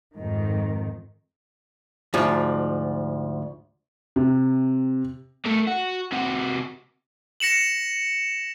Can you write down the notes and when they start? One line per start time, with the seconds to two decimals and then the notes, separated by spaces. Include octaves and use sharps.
0.14 F2 G#2 D#3
2.14 D2 G#2 F3
4.16 C3
5.45 A3 A#3
5.67 F#4
6.12 C3 F#4
7.40 A#6 C#7 E7 F#7